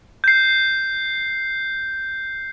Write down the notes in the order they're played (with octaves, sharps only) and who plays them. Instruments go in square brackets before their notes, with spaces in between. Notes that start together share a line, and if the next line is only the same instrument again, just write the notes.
[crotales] G6 C7